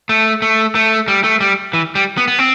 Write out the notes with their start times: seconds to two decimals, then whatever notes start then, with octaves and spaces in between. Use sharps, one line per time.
0.09 A3
0.42 A3
0.75 A3
1.08 G3
1.24 A3
1.40 G3
1.73 E3
1.95 G3
2.17 B3
2.28 B3
2.39 C4